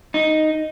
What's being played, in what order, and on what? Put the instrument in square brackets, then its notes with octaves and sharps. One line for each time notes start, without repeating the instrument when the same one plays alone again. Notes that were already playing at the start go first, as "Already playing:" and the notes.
[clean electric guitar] D#4